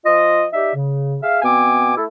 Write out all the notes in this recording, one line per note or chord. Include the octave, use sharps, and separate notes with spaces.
F3 F4 D#5
D#4 G4 D5 E5
C#3
G#4 E5 F5
B2 B3 C4 G#5 D6
A3 E4 A4